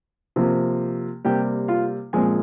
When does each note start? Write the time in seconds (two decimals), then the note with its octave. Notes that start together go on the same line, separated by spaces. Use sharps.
0.36 C3 F3 A#3
1.25 C3 G3 A#3 G4 G5
1.68 F4 F5
2.13 A#2 F3 G#3 C4 G#5